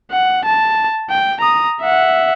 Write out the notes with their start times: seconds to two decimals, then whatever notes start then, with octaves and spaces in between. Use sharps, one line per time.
0.12 F#5
0.45 A5
1.10 G5
1.41 A#5 D#6
1.81 E5 F#5